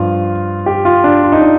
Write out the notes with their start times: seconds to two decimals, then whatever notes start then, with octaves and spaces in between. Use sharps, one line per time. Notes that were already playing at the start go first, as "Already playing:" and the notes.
Already playing: G2 F3 F4
0.66 G4
0.85 F4
1.04 D4
1.23 F4
1.32 D#4
1.41 D4